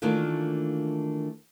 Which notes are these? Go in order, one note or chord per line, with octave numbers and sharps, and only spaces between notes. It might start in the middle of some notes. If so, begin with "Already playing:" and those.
D#3 E3 A3 A#3 D4 F4